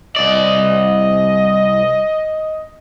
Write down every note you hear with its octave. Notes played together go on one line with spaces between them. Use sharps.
C2 D5 D#5